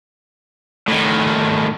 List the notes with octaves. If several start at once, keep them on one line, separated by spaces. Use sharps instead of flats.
A2 D#3